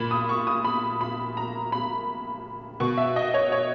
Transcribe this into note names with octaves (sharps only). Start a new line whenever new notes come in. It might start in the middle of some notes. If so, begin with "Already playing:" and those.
Already playing: A#2 B5
D#6
C#6
D#6
B5
B5
A#5
B5
B2 C#6
E5
D#5
C#5
C#5